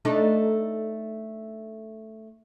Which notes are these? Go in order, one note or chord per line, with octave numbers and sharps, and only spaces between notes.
A3 D4 D#4